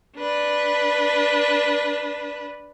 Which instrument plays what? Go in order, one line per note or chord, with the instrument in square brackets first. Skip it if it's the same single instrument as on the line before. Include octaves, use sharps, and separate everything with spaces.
[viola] D4 B4